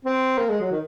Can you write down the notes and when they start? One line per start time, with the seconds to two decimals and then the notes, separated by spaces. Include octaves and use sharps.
0.05 C4
0.38 A#3
0.49 G#3
0.61 F#3
0.72 D#3